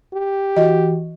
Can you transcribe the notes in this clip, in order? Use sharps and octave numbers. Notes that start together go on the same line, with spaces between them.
G4
E3 F#4 D#5